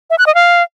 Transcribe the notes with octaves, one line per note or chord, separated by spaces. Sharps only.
E5
F#6
D#5
F5